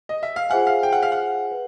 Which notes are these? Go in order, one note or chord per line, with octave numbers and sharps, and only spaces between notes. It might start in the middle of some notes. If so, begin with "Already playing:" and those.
D#5
E5
F5
F4 G#4 C5 E5 F#5 G#5
F5
G5
F#5
F5
F#5
B4 E5